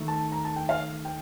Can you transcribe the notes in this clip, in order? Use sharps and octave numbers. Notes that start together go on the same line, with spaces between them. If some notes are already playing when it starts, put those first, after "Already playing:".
Already playing: D#3 A3 D#4
A5
A#5
A5
G5
F5
G5